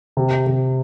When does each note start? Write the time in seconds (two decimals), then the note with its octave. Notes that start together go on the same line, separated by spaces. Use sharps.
0.17 C3
0.47 C3